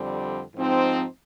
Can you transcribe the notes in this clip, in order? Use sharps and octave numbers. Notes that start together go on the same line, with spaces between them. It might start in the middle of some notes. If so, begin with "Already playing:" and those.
Already playing: F2 D3 G3 C4
G#2 F3 C4 D#4